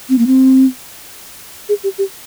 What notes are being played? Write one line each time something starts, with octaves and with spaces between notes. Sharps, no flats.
C4
A#3
C4
G#4
G4
G4